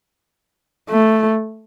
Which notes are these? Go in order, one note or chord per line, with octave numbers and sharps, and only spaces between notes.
A3